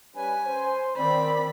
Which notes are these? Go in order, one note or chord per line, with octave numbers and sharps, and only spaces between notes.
G3 C#4 B4 G#5
C5
D#3 C4 D5 B5